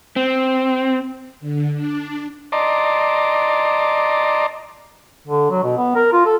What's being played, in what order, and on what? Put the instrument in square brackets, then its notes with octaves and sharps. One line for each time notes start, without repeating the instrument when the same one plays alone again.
[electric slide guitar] C4
[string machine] D3
D4
[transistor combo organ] D5 D#5 A5 A#5 C6 D6
[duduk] D3
F#3
B2
B3
A#4
F4
A4